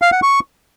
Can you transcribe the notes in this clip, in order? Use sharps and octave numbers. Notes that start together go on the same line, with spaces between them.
F5
F#5
C#6